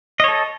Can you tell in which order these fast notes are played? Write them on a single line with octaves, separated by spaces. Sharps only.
D#5 C#5 A4